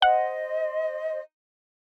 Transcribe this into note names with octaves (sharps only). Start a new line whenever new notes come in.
C5 D#5 F#5